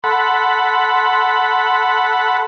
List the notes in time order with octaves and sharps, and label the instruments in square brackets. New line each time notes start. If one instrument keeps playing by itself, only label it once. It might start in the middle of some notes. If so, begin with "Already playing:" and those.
[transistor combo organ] A4 F#5 B5 [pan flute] C6